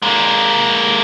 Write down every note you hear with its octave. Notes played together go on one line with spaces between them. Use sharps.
G#3 A#3